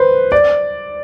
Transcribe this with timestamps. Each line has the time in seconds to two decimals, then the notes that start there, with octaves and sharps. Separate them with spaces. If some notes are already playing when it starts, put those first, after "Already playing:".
Already playing: B4 C5
0.32 D5